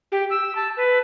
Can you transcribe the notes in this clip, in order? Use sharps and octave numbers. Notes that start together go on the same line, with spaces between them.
G4
E6
A5
B4